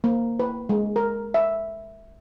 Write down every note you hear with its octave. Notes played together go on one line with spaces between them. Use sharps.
A#3
B4
G#3
A#4
E5